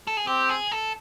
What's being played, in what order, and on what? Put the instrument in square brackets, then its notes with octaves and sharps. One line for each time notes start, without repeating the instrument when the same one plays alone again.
[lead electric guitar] A4
G#4
[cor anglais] C4 [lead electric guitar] G4
[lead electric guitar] G#4
A4